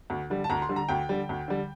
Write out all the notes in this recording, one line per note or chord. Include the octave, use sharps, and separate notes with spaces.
D2
D3 G3
A5
D2 A#5
C6
D3 G3
A#5
D2 G5
D3 G3
D2
D3 G3